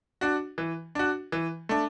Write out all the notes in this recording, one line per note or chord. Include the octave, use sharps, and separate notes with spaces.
D4 F#4
E3
D4 F#4
E3
A3 D4